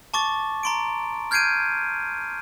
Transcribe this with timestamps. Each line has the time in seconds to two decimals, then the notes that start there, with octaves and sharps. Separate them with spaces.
0.14 A5 C#6 D6 A6
0.63 A#5 C6 D7
1.31 F6 G6 G#6 C7 D7 D#7